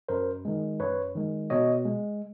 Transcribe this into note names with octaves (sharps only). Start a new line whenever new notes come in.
F#2 A#4 C5
D#3 G#3
F#2 B4 C#5
D#3 G#3
B2 C#5 D#5
G#3